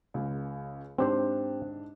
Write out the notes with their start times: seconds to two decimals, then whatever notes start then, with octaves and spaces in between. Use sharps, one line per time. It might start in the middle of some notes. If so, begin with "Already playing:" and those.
0.14 C#2 C#3
0.98 G#2 C4 D4 G4 C5